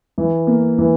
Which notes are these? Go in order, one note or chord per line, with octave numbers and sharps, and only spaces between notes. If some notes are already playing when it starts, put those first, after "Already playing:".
E3
A#3
E3